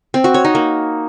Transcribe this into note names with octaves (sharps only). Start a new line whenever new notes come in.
C4
F#4
C#5
D#4
A#3